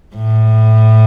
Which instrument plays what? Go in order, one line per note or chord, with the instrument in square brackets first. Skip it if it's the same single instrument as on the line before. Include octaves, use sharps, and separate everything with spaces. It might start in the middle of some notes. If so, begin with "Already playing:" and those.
[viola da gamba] A2